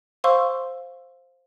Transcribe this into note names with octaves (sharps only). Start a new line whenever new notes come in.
C5 F5 C6 C#6 E6